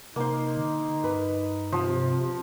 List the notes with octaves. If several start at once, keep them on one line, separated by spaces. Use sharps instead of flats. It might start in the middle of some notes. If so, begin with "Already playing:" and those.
C3 A#3 D#4 C5
D3
G2 B4
C3 F3